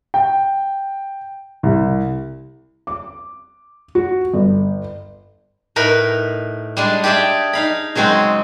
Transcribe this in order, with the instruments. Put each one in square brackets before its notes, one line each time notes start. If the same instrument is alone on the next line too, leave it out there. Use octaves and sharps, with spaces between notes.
[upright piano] G5
C2
[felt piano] D6
F#4
G1
[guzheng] A2 D#4 A#4 B4 B5
G3 G#3 D4
G4 G#4 D5 E5 G5
D#4 F5 B5
C#3 F#3 G#3 C4 F#4 G#4